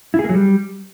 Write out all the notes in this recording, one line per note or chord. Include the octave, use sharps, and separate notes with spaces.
E4
G#4
A#3
F#3
G3